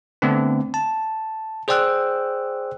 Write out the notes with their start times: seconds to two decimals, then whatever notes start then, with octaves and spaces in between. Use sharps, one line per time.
0.22 D3 A3 B3 C4 D4
0.74 A5
1.68 G#4 C5 D5 G5 E6 F#6